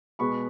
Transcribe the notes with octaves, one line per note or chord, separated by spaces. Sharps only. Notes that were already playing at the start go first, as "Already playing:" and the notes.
B2 G#3 B3 B5 C#6